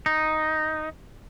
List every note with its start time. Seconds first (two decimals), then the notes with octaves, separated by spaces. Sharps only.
0.06 D#4